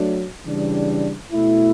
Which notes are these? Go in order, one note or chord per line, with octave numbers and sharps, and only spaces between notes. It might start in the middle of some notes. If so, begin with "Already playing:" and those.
Already playing: F#3 A3 D4
C#3 E3 G3 D4
B2 A3 E4